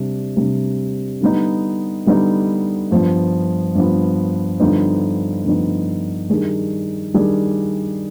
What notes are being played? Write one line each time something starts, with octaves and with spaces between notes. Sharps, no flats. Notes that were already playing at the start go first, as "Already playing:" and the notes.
Already playing: C3 G3 D4
C3 G3 D4
D3 G3 B3 D#4
D3 G3 B3 D#4
G2 F3 B3
G2 F3 B3
G2 D3 F3 B3 D#4
G2 D3 F3 B3 D#4
D#3 G3 D4 G#4
D#3 G3 D4 G#4